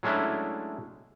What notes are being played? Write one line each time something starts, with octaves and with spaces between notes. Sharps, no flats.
F#3 G#3 A3 C#4 D4 E4